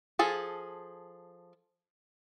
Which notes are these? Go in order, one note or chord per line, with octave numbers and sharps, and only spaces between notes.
F3 G#4 A4